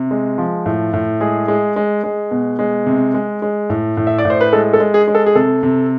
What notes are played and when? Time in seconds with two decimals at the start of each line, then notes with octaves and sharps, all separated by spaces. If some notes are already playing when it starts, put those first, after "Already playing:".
Already playing: C3
0.11 G#3
0.38 F3
0.66 A2
0.93 A2
1.21 G#3 G#4
1.48 G#3
1.76 G#3
2.04 G#3
2.31 B2
2.59 G#3
2.86 C3
3.14 G#3
3.42 G#3
3.70 A2
3.97 A2
4.07 E5
4.18 D5
4.25 A2 C5
4.41 B4
4.53 G#3 A4
4.73 A4
4.80 G#3
4.94 G#4
5.08 G#3
5.15 A4
5.26 G#4
5.35 C3 A4
5.63 C3